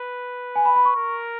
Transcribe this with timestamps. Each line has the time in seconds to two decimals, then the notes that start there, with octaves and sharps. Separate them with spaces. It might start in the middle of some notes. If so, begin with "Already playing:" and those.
Already playing: B4
0.56 G#5
0.65 B5
0.76 B5
0.85 C#6
0.96 A#4